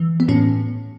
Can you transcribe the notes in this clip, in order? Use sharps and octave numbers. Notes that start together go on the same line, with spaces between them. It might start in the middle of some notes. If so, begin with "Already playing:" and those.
Already playing: E3
B3
A2 C#4